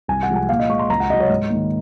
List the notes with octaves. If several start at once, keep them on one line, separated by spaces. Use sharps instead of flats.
C2 G#5
F#5
C3 F3 G#3
G#5
A#2 F5
D#5
G#3 C#6
C6
C#2 A#5
F#5
C3 F#3 D#5
C#5
G#2
D#3 A#3